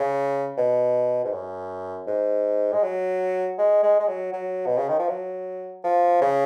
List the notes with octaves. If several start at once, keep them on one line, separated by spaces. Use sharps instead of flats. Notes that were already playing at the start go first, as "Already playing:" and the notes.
Already playing: C#3
B2
G#2
F#2
G#2
G#3
F#3
G#3
G#3
G#3
F#3
F#3
B2
C#3
D#3
F3
F#3
F3
C#3